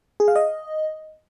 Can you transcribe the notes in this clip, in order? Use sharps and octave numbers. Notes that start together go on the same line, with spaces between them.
G#4
F5
D#5